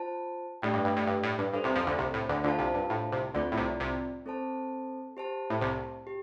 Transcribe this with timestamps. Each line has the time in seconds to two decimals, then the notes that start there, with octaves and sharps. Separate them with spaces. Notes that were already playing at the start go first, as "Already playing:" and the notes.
Already playing: F4 C5 A5
0.62 A2 A3 D4 G4 D5 G5
0.73 G2
0.85 G2
0.97 A2
1.07 G2
1.23 A2
1.38 G2
1.53 G2 D4 A4 C5
1.64 C2 C3
1.75 F2 F3
1.87 D2 D3
1.98 C2 C3
2.14 A2
2.29 D2 D3
2.44 D2 D3 D4 F4 C5 F5 A5
2.59 C2 C3
2.74 G2
2.90 A2
3.12 C2 C3
3.34 D2 D3 C4 F4 D5
3.52 A2
3.57 C2 C3
3.80 C2 C3
4.26 C4 A4 C5 A5
5.17 G4 C5 A5
5.50 A2
5.61 C2 C3
6.07 G4